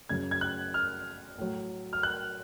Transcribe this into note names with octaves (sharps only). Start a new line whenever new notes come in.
F#2 C#3 F#3 G#6
G#6
F#6
F6
A2 F#3
F6
F#6